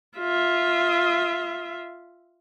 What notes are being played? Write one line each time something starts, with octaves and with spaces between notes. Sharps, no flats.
F4 E5